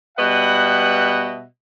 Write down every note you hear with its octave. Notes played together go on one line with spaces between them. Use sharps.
B2 G3 B4 D#5 E5 F#5